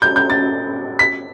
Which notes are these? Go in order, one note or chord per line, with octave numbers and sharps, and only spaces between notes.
G6
G6
A6
B6